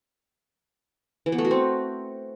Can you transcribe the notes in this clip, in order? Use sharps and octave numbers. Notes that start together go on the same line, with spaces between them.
E3
B3
A3
F#4
C4